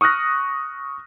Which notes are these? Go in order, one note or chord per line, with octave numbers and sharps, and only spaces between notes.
C#6 D#6 F6 F#6 A#6